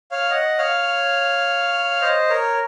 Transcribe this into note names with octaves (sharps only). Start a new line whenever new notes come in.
C#5 F5
D#5 F#5
C#5 F5
C5 D#5
A#4 C#5